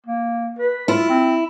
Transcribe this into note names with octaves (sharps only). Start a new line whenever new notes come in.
A#3
B4
E4 F4
C4